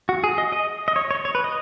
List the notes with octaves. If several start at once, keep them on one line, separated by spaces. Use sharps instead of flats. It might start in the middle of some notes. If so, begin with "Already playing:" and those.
F#4
G#4
D#5
D#5
D#5
C#5
C#5
C#5
B4
D#5